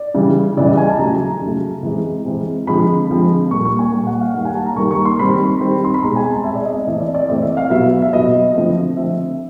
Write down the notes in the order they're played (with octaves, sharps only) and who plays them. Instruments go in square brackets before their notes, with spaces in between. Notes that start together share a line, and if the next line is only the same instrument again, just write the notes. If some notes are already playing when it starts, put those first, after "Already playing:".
Already playing: [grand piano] D5
C#3 E3 G3
C#3 E3 G3 D5
D#5
G#5
A5
C#3 F#3 A3 A#5
C#3 F#3 A3
E3 G#3 C4
E3 G#3 C4
D3 F3 G#3 C4 B5
D3 F3 G#3 C4
A#2 G3 A#3 C#6
C#6
G#5
A#2 G3 A#3 G#5
F#5
F5
D#3 G3 A#3 F#5
G#5
A5
A#5
D#3 G3 A#3 C#6
C#6
C6
D#3 G3 C4 B5
D#3 G3 C4
C6
B5
B2 G#3 C4 A#5
G#5
A5
B2 G#3 C4 E5
D5
D#5
E5
E3 A3 C4 D#5
D5
D5
E3 A3 C4 D#5
E5
F5
B2 F#3 B3 E5
E5
B2 F#3 B3 D#5
D3 F3 A3 C4
D3 F3 A3 C4 E5